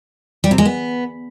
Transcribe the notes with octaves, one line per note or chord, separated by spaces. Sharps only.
G3
C3
G#3
B3